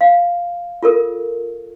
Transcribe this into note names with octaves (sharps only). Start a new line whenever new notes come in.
F5
F4 A4 A#4